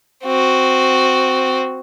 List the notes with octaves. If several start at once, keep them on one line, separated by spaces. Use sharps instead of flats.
C4 F#4